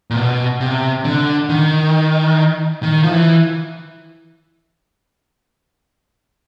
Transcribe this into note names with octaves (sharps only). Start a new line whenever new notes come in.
A#2
B2
C3
D3
D#3
D#3
F3
E3